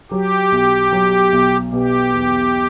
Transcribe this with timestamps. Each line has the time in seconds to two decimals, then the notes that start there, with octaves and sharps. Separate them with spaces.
0.11 F#3 G4
0.52 B1
0.92 F#3
1.32 B1
1.72 B2 G4
2.13 E2